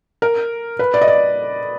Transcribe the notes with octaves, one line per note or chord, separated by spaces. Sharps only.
A#4
B4
D5
D#5
D5